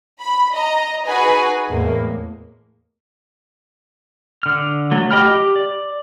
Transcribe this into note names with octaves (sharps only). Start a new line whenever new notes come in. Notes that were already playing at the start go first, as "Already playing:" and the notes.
B5
D#5 A#5
D#4 F#4 G#4 B4 G#5
E2 A2 G#3 A#3
D3 F6
F#3 A3
G4 D#5 G5 B5 F6
G4
D5